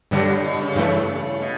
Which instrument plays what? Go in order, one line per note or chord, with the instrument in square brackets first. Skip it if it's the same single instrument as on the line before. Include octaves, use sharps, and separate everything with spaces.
[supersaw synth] G2 D3 G3 [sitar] F#3
[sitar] A2
B2
C#3
[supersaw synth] G2 E3 A3
[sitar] B2